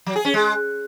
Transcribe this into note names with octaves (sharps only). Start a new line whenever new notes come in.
F#3
G#4
C#4
G#3